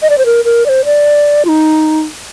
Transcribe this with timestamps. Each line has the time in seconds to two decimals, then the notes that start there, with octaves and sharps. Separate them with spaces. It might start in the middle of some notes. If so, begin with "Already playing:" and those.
0.02 D#5
0.10 D5
0.18 C5
0.26 A#4
0.45 A#4
0.66 D5
0.69 C5
0.85 D5
1.45 F4
1.49 D#4